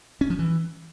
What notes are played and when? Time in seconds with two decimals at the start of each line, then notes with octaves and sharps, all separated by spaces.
0.21 C#4
0.30 F3
0.39 E3